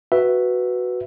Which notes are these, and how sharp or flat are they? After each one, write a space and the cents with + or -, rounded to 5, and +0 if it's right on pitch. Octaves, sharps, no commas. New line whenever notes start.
F#4 +0 B4 +0 E5 +0